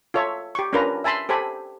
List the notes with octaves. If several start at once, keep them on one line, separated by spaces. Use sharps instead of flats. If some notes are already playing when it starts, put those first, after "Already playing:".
F4 A4 C#5 E5
G4 C#6
C#4 D4 F4 A#4 B4 A#5
E5 G#5 A5 B5 C6
G4 A4 C5 G#5 B5